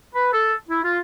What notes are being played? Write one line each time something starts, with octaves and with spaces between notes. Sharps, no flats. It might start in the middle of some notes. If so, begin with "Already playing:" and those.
B4
A4
E4
F4